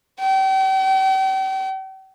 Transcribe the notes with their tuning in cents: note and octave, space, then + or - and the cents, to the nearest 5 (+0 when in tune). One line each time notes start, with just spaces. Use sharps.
G5 -40